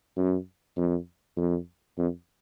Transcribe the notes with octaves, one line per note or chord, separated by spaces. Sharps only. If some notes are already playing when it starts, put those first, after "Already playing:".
F#2
F2
F2
F2